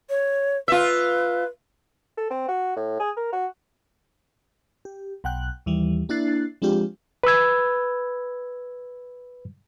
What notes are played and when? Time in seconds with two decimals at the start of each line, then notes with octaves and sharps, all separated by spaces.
0.10 C#5
0.68 F4 B4 E5
2.17 A4
2.30 C4
2.48 F#4
2.76 A2
2.99 G#4
3.16 A#4
3.33 F#4
4.85 G4
5.24 B1 F#5 G5 F#6
5.66 D#2 E3 G3
6.09 A#3 D4 E4 F#6 A6 C7
6.62 F3 G#3 C4 D4 F4 G4
7.24 B4 B5 E6 G#6